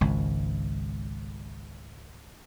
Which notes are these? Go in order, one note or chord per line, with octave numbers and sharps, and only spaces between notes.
G#1 C#2